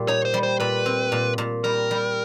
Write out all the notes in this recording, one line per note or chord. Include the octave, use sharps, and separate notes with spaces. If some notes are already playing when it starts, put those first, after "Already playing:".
Already playing: A#2 G3
D#4 C#5
C5
G3
C5
A#2 B4
C4
A#2
A#2
G3 A#4
G3